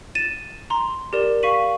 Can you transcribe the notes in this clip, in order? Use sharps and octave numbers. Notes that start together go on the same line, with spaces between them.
A6 D#7 E7
A#5 C6
G4 A#4 D5 E7
F5 C#6 B6 D#7 F#7